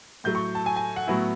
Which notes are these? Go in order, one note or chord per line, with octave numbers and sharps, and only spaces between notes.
A2 F#3 A3 G6
C#6
A5
G#5
G#5
F#5
A2 F#3 B3 E4